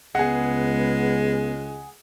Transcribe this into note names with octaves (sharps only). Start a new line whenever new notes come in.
C#2 G#3 B3 G#4 F#5